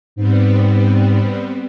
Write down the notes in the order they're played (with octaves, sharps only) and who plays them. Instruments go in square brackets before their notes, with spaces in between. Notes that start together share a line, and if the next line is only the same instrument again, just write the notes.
[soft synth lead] G#2 [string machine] G3 B3 C4